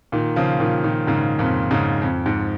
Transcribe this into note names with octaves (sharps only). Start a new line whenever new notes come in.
A#2 D#3
C#3 F3
A#2 D#3
A#2 D#3
G#2 C#3
F2 A#2
G#2 C#3
F2
G#2